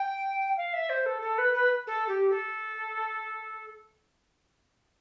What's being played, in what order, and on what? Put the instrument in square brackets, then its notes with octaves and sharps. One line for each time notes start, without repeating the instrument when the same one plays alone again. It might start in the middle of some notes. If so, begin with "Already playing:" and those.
Already playing: [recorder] G5
F5
E5
C5
A4
A4
B4
B4
A4
G4
A4